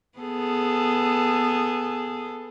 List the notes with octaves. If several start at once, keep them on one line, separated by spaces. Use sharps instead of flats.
B3 G#4 A4